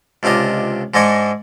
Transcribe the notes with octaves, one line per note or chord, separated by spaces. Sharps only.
C#2 C3 D4 F4 D#5
G#2 G#3 D4 D#5 G#5 C#6